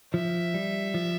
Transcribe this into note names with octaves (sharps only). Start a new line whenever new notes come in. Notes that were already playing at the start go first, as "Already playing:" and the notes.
F3 E5
G3
F3